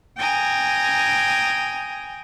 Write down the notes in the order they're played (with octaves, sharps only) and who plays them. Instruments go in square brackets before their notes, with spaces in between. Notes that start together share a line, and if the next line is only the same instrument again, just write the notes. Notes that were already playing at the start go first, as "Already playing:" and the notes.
[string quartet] G5 G#5 A#5 D#6